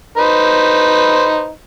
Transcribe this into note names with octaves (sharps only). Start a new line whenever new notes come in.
D#4 B4 C5